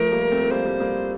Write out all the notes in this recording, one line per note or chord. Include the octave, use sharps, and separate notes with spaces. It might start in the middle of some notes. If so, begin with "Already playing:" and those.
Already playing: F3 A3 A#4
G3 A#3
A3 C4
G3 A#3 C5
G3 A#3
G3 A#3